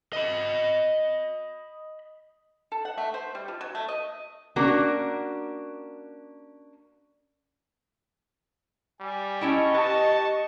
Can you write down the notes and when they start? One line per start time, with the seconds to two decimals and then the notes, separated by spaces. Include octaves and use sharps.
0.13 D#5 B5
2.72 A4
2.85 F#5
2.98 A3
3.14 C5
3.35 G3
3.48 F3
3.61 F#3
3.75 A3
3.89 D#5
4.56 A#3 C#4 D4 F#4 A#4
9.01 G3 G#5
9.41 C#4 E4 D#5 G5 A5 C#6
9.74 G4 B4 A5